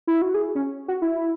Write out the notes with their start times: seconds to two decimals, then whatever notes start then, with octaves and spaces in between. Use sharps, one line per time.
0.07 E4
0.22 F#4
0.34 G#4
0.55 C#4
0.88 F#4
1.02 E4